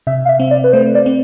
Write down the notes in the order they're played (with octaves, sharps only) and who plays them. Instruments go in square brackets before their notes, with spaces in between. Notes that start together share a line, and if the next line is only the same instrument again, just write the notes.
[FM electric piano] C3 [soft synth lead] E5
[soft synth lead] F5
E5
[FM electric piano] C4
[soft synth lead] D5
B4
[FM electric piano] A3 [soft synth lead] C5
[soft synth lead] D5
[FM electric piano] C4